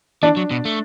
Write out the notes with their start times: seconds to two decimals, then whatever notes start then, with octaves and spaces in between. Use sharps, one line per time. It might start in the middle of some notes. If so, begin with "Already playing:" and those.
0.23 E3 D4
0.37 F#3
0.51 B2
0.65 A3